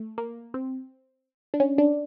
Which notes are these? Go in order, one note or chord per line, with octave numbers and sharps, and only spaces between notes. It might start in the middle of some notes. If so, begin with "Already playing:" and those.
Already playing: A3
A#3
C4
D4
C#4
D4